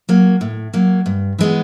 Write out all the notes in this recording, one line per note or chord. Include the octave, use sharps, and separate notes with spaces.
F#3 A#3
A2
F#3 A#3
G2
E3 G#3 B3